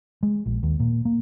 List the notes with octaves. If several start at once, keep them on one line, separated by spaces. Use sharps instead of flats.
G#3
A#1
D#2
A#2
A#3